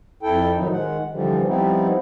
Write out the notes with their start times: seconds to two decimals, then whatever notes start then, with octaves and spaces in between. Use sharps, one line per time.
0.23 F2 E4 A4 G5
0.56 A2 D#3 F3 F#3 D#4
0.73 D#3 G#3 F#5
1.11 D3 E3 F3 G3
1.47 F3 G3 B3 C4 D#4 E4